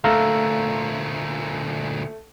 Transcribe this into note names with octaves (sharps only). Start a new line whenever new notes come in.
D2 A#2 A3 F5 A#5 E6